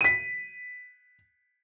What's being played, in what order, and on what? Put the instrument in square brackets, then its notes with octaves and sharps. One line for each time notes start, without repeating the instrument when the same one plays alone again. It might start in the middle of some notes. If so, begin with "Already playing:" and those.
[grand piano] B6 D#7